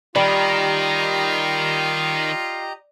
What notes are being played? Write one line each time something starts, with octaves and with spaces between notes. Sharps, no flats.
D#3 G3 F4 G4 D#5 A#5